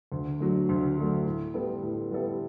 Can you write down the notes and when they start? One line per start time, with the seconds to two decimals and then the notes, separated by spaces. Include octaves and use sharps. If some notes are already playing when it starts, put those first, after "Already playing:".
0.12 D2
0.40 D3 F#3 A3
0.69 D2
0.97 D3 F#3 A3
1.26 A2
1.54 G3 B3 E4 A4
1.83 A2
2.11 G3 B3 E4 A4